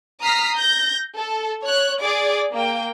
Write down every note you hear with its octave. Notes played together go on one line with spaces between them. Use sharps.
A#5 D#6 F6 B6 C7
G6 A#6
A4
C#5 F#6
G#4 D5 D6
A#3 G5